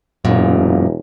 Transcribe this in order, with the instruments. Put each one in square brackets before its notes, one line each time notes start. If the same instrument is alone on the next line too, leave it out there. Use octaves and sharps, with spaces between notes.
[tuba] E1 [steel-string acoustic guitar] F#2 A#2 C#3